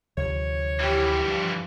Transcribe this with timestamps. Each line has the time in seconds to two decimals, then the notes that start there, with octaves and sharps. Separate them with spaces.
0.17 D2 C3 F3 C#5
0.80 E3 G3 E4 G4
1.23 G2 F3